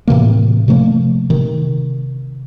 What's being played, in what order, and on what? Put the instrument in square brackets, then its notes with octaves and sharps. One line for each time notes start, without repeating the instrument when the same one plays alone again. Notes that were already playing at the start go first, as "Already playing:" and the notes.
[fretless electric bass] A2 C3 E3 A#3
C3 F3 A3 A#3
C3 D#3